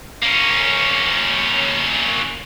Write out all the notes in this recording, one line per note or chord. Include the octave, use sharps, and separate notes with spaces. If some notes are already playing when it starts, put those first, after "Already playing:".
A#3 C#4